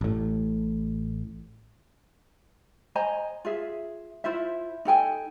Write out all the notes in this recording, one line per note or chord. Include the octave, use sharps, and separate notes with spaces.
A1 A2
C5 D#5 G#5 A#5
F4 G#4 E5
E4 F4 C5 E5
D#4 A4 G5 G#5